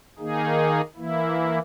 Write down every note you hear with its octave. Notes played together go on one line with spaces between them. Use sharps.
D#3 A#3 D#4 G#4
E3 A#3 E4